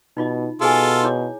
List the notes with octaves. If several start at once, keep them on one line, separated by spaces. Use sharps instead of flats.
B2 D#4 F4 D#5
B2 F4 G#4 A4 G#5 C6
E4 C#5 D6